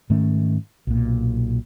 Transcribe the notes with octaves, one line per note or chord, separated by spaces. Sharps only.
G#2 D#3 A3 C#4
B1 A#2